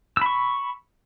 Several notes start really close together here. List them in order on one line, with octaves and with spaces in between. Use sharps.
E6 B5 C#6